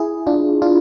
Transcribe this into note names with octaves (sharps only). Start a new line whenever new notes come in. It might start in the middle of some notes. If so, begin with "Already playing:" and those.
Already playing: E4 G#4
D4 F4
D4 F4